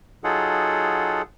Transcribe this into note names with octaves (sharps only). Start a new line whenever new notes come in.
F#3 D#4 F4 G#4 A4 F#5